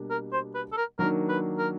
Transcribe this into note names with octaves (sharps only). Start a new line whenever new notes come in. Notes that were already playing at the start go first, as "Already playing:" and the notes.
Already playing: B2 G3 A#3 D4
A#4
C5
B4
A4
A#4
D#3 F#3 A#3 D4 A#4
B4
A#4